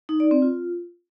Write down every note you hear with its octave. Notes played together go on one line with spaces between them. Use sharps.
D#4
D5
C4
F4